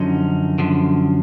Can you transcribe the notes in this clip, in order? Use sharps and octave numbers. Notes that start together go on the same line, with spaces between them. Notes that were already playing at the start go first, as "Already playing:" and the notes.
Already playing: F#2 D3 F3 C#4 D#4
F#2 D3 F3